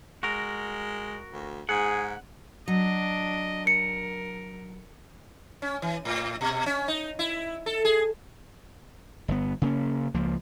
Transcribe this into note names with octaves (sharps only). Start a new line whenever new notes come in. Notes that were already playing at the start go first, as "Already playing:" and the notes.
G#3 F#4 A#4
D2
G#2 G#4 F#5
F#3 D4 D#5
A#4 C#7
C#4
E3
A2
B2
C#4
D#4
E4
A4
G#4
G1 B3
C#3 A#3 C#4
C#2 F3 A#3